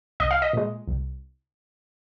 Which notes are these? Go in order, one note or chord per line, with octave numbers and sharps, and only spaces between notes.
C2 D#5
F5
D#5
A#2 G#3
C2